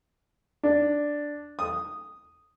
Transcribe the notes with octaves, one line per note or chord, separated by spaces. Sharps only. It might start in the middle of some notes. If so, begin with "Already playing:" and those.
D4
D#6